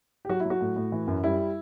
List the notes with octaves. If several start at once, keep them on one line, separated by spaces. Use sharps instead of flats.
G4
F#3 F#4
E4
F#3
F#4
A2
A2
E3
F#2
G3 E4